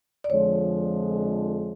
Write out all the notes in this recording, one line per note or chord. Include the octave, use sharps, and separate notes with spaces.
D5
F2 D3 F3 G#3 C#5